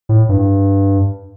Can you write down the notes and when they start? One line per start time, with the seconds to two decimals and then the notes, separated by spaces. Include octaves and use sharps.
0.09 A2
0.29 G2